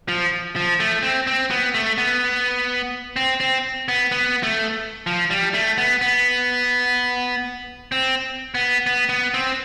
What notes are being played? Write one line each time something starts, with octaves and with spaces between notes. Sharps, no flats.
F3
F3
A3
C4
C4
B3
A3
B3
C4
C4
B3
B3
A3
F3
G3
A3
B3
B3
C4
B3
B3
B3
C4